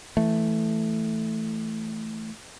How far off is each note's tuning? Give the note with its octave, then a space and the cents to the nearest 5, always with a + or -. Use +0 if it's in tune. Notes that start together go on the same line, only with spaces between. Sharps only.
E3 +0 A3 +0